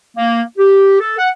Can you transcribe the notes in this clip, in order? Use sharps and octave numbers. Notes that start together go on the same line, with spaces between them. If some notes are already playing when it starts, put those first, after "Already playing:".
A#3
G4
A4
F#5